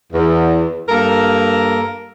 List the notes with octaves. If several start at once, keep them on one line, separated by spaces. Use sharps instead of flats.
E2
G2 A#3 A4 A#4